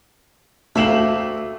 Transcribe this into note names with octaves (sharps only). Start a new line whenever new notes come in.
D2 A3 A#3 E5 F5 G5 E7 F#7